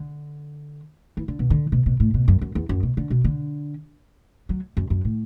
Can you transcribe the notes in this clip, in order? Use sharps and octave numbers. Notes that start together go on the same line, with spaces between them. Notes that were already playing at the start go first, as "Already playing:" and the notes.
Already playing: D3
E3
D3
B2
D3
B2
B2
A2
B2
F#2
F#2
E2
F#2
B2
D3
B2
D3
F#3
F#2
F#2
A2